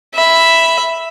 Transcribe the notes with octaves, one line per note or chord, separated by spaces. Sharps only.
E5 B5